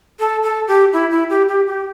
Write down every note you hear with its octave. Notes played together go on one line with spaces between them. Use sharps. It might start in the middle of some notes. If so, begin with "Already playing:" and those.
A4
A4
G4
E4
E4
G4
G4
G4